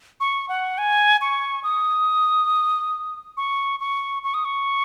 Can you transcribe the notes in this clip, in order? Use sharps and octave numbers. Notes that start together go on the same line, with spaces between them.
C#6
F#5
G#5
C#6
D#6
C#6
C#6
C#6
D#6
C#6